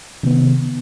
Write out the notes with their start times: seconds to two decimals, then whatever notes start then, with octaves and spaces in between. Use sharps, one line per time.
0.23 C3 D#3 B3